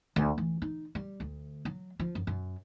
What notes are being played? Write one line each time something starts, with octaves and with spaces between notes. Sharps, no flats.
D2
E3
D#4
G3
D2
F#3
F3
F#2
F#2